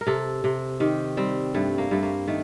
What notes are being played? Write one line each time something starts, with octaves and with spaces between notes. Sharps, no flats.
A#4
C3 A4
C3
D#3 G4
G3 C4
G2 A3
A#3
G2 A3
A#3
D#3 A3